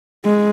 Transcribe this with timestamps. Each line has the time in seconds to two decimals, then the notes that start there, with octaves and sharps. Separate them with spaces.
0.25 G#3